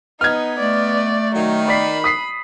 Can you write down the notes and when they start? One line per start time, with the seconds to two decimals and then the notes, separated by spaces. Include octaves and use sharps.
0.21 B3 D#4 F6 G#6
0.60 A3 D5
1.36 D#3 F#3
1.68 D5 B5 B6 C7
2.04 D#6 B6 C7